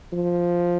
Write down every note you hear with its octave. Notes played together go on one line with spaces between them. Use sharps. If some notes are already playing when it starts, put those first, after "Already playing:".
F3